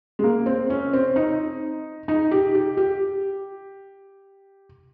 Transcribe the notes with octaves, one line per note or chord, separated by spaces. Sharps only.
G#3
A#3
C4
C#4
C4
D#4
D#4
G4
G4
G4